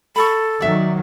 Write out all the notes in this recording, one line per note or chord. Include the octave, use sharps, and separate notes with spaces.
A4 B5 C#6
D#3 F#3 D5 E5